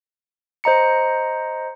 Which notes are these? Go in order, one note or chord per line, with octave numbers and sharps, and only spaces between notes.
C5 D#5 A#5 C#7